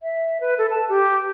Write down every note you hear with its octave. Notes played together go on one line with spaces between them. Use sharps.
E5
B4
A4
A5
G4